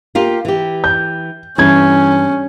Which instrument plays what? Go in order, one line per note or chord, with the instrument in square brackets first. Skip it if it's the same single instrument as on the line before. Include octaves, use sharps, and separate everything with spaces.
[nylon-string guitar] A#3 F4 G4
E3 G4
[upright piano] G6
[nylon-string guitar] G2 [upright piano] E3 G#6 [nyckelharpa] C#4